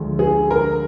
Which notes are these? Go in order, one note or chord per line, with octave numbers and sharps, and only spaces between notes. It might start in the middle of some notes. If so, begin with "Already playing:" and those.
Already playing: D2 D3 F3 G#3
G#4
A#4